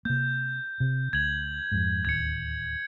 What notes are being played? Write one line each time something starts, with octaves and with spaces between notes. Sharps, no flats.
C3 A#3 G6
C3
D2 G#6 F#7
F2 G#2
D1 D#2 G#6 C#7